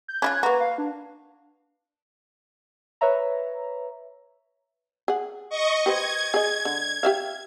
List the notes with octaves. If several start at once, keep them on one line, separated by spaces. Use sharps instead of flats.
G6
C#4 E4 F4 F#6 G#6
A#3 F#4 B4 A#5
F5
D4
B4 C#5 E5 A#5
G#4 F#5
D#5 C#6
G4 B4 C5 G#6
G#4 D#5
D3
G4 E5 F5